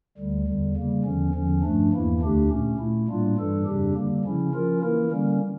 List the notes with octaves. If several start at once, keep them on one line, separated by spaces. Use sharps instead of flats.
D2 D3 G3
E2 D3 G3
C#3 G3 A#3
E2 D3 F3 C#4
E2 D3 F3 C#4
G2 F3 A3 D4
E2 E3 A#3 E4
D2 D3 A3 D4 G4
A#2 A3 C#4
A#2 A3 E4
A2 G3 A#3 D4 F4
G2 E3 G3 D4 A4
F2 C#3 G3 D4 G4
D3 G3 A#3
C#3 F3 C#4 E4
F3 C#4 F4 A#4
E3 A#3 E4 A#4
D3 G3 A#3 C#4